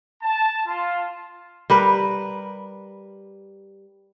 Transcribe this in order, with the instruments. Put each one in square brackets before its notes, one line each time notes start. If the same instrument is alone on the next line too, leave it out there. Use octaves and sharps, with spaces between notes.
[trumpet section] A5
F4
[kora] G3 A#4 B4